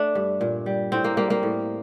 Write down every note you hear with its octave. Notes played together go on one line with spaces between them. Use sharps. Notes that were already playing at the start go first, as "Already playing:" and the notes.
Already playing: A3 D4
G2
A#2
G3
A2 C4
A#3
G3 A#3
A#3
A2